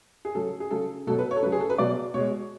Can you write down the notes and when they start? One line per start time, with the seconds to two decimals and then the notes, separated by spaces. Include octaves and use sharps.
0.25 G#4
0.35 C#3 F#3 A4
0.60 G#4
0.71 C#3 F#3 A4
1.07 B2 F#3 A4
1.19 B4
1.31 C#5
1.36 A4
1.43 C#3 B4
1.46 F#3
1.52 G#4
1.60 A4
1.70 B4
1.78 B2 F#3 D5
2.14 B2 G#3 C#5